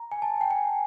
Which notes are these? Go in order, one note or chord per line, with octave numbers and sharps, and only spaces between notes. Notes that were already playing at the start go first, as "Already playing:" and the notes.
Already playing: A#5
G#5
A5
G5
G#5